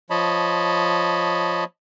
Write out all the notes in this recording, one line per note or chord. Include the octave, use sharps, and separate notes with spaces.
F3 C#5 D#5 A5 B5